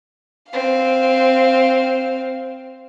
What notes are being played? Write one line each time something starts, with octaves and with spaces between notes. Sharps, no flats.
C4 F5